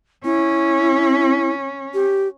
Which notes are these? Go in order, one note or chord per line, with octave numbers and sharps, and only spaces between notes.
C#4 E4
G4